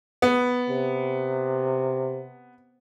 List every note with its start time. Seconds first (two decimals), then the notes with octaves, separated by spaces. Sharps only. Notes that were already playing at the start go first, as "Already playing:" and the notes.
0.22 B3
0.70 C3